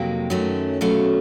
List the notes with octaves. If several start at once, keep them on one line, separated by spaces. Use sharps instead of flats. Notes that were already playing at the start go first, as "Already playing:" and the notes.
Already playing: F2 C3 D#3 F#3 A#3 G5
F#2 D#3 F#3 A3 C#4
B2 F#3 A3 C#4 F5